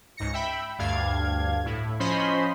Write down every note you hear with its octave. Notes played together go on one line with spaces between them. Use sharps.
C#2 G#2 A#6 C#7
E5 G5 B5
D2 G2 D4 F5 G#6
A2 E4
F3 C#4 C5 D#5 B5 C6